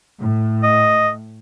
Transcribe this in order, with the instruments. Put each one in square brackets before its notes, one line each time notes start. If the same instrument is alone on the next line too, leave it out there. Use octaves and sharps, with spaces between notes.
[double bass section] A2
[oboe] D#5